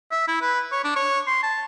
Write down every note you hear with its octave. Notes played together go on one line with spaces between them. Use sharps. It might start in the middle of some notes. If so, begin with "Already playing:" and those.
E5
E4
B4
C#5
D4
C#5
C6
A5